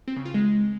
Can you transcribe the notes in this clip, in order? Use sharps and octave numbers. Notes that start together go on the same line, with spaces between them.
C4
C#3
F4
G#3